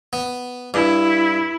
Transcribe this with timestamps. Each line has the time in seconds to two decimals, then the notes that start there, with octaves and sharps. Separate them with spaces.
0.13 B3
0.74 G2 E4